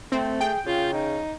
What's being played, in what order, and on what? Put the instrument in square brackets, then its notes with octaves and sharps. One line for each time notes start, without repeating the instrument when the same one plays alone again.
[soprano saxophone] A3 [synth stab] C4
[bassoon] G#4 [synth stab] G5
[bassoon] C#3 [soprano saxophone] F4
[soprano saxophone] D#4